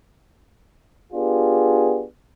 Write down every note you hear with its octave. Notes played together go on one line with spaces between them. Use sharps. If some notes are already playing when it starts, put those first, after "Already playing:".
B3 D4 F4 G4 G#4